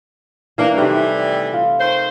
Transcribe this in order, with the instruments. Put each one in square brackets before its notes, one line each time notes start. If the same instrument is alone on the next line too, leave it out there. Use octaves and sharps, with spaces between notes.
[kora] E3 D4 [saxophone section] A#3
[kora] C3 D#3 A3 [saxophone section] E3 G3
[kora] F4
[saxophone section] D#3 C5